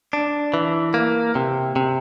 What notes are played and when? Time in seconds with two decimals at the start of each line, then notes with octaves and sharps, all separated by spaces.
0.13 D4
0.54 E3
0.94 A#3
1.35 C3
1.76 C3